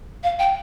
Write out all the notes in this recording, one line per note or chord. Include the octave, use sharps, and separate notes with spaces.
F5
G5